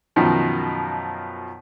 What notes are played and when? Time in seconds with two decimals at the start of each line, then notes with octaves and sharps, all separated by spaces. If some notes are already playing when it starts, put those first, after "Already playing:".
0.16 F#2 B2 D#3 F3